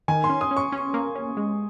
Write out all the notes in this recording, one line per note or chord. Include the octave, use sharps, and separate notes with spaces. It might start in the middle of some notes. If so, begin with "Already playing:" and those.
D#3 G#5
C6
C#4
D#6
C#4
C#6
C#4
A#3
C#4
G#3